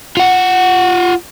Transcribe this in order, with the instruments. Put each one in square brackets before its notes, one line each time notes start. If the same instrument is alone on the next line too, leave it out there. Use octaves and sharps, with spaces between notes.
[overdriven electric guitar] F4 F#5